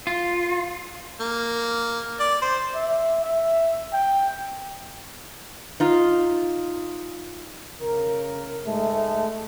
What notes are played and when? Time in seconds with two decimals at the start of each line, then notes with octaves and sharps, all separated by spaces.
0.07 F4
1.20 A#3
2.20 D5
2.41 C5
2.75 E5
3.24 E5
3.93 G5
5.80 D#4 F4 F5
7.81 C#3 A#4
8.65 G#2 G#3 A3